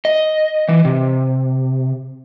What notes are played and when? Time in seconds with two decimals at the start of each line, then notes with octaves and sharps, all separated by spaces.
0.05 D#5
0.68 E3
0.85 C3